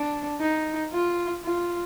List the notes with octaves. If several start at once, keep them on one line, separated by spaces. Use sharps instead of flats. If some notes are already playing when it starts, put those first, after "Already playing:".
Already playing: D4
D#4
F4
F4